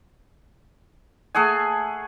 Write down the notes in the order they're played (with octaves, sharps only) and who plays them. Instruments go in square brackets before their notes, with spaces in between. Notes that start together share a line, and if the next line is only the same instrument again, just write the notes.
[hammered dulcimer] A3 G#4 F#5 G#5